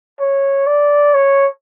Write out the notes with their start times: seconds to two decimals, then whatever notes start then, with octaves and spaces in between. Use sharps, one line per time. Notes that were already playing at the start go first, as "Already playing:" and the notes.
0.20 C#5
0.67 D5
1.15 C#5